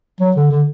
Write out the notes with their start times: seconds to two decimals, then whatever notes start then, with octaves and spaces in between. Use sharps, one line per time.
0.20 F#3
0.36 D3
0.51 D3